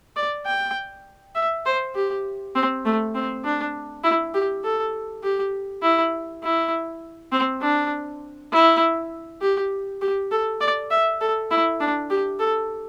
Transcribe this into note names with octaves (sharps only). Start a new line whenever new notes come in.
D5
G5
E5
C5
G4
C4
A3
C4
D4
E4
G4
A4
G4
E4
E4
C4
D4
E4
G4
G4
A4
D5
E5
A4
E4
D4
G4
A4